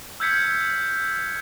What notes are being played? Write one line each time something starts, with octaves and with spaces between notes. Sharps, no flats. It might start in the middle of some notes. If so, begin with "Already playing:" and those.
E6 F6 G6 G#6 B6 C#7